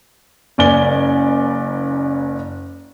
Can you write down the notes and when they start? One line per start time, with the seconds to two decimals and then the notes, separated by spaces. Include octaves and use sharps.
0.58 F#1 D5 G#5 G7